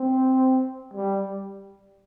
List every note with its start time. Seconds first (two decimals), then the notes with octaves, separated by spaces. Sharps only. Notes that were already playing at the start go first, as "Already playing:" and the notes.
Already playing: C4
0.94 G3